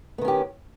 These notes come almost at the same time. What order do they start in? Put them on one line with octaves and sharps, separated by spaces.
B3 D#3 C#4 G4